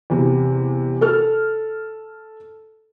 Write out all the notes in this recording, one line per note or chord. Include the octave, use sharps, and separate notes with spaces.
E2 C3
A4 F6